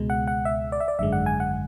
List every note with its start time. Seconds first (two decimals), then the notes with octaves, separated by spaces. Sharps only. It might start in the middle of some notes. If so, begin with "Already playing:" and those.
Already playing: C#2 B2 G#3
0.10 F#5
0.27 F#5
0.45 E5
0.72 D5
0.80 E5
0.88 D5
0.99 G#1 F#2 D3 G#3 E5
1.13 F#5
1.26 G#5
1.40 F#5